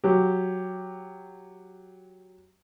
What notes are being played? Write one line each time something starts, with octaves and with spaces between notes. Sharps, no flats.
F#3 G4